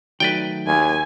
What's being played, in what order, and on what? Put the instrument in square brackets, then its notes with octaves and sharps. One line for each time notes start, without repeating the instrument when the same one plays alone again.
[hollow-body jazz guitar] D#3 F#3 A3 [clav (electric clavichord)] B4 D5 G5
[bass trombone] D#2 [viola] G#5